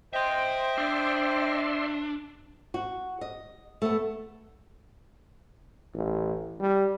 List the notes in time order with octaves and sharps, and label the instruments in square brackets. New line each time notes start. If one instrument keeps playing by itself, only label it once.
[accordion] C5 D#5 G5 [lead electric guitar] E5 C6
[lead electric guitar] D4 [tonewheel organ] D5 E5 C6
[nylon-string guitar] F#4
D#5
A3 B3
[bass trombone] A1
G3